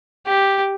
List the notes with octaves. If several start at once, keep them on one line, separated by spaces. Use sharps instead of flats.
G4